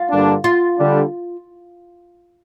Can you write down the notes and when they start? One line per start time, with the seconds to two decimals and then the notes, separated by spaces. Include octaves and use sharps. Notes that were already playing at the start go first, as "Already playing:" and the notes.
Already playing: F4
0.10 G2 D3 G3 A#3 D4
0.44 F4
0.78 D3 G3 D4